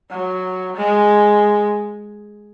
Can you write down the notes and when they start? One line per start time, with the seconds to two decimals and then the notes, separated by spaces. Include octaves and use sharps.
0.10 F#3
0.77 G#3